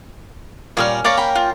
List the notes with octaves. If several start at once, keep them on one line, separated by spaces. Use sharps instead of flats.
A#2 G3 C#4 E6 F6
A#3 C#4 D5 F5 C#6
A#4 G5 B5
F4